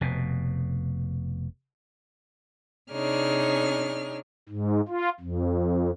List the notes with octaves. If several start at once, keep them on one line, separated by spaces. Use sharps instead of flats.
F1 B2
C3 D4 D#4 G#4 C#5 F6
G#2
F4
F2